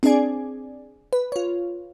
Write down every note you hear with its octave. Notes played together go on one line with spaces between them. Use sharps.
C4 D4 G#4 D5 G#5
B4
F4 C#5